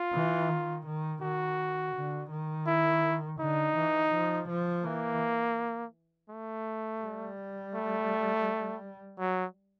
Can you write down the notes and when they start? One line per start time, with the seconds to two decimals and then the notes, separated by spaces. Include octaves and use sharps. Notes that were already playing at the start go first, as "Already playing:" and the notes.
Already playing: F4
0.13 E3
0.49 D#3
0.86 D#3
1.22 D#3 F#4
1.95 D3
2.31 D#3
2.67 E4
3.40 D3 D#4
3.76 E3
4.12 F3
4.49 F3
4.84 E3 A#3
6.30 A3
7.02 G3
7.75 A3
9.20 F#3